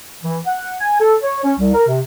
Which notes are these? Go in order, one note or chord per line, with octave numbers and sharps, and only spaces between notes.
E3
F#5
G#5
A4
C#5
C#4
C2
A#4
C3